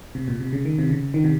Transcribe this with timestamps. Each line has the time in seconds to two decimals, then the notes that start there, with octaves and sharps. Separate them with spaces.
0.15 C3
0.28 A#2
0.40 C3
0.53 C#3
0.65 D#3
0.79 C3
0.90 C#3
1.14 D#3
1.24 C3